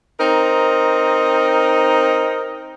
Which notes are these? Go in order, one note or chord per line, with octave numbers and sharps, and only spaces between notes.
C4 D#4 A#4